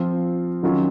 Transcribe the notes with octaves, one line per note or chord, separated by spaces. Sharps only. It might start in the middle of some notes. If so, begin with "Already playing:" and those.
Already playing: F3 C4 F4
D#3 F#3 C#4 F4